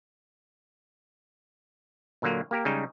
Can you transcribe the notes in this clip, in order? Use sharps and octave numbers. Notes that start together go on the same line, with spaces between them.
A#2 D3 F#3 A#3
A#3 G4 A#4
C#3 G3 G#3 D#4